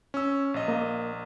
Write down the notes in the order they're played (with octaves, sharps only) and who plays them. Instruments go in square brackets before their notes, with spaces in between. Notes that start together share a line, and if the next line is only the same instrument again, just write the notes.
[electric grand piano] C#4 E6
A#1 D#5
[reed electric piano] A#3